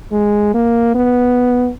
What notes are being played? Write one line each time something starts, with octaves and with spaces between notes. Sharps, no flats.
G#3
A#3
B3